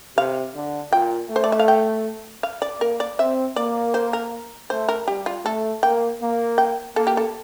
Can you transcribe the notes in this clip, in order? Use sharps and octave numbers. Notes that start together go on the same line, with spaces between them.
C3 F5
D3
A#2 G5
A3
C5
D5
E5
F5
G5
F5
D5
A#3 A#4
D5
C4 E5
A#3 D5
C5
A#4
A3 C5
A#4
G3 G4
F4
A3 A4
A#3 G5
A#3
G5
A#3 A4
G4
A4